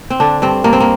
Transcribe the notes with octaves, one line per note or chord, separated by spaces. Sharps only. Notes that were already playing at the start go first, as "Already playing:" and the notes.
C4
D3 D4
G2 C4
G2 A#3
C4
A#3